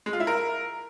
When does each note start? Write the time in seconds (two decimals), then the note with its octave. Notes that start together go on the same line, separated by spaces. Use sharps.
0.06 G#3
0.13 F4
0.20 E4
0.27 A#4